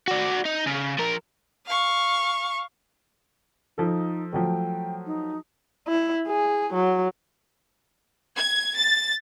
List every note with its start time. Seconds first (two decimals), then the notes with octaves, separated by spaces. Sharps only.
0.08 F#4 D5
0.46 D#4
0.67 C#3
0.99 F3 A#4
1.65 F5 C#6
3.78 F3 D#4 A4
4.33 F3 F#3 A3 G5
5.06 D#4
5.88 E4
6.27 G#4
6.73 F#3
8.38 G#6
8.77 A6